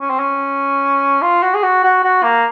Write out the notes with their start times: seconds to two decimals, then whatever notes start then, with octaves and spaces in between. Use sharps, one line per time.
0.01 C#4
0.10 C4
0.19 C#4
1.22 F4
1.43 F#4
1.55 G#4
1.63 F#4
1.84 F#4
2.04 F#4
2.23 A#3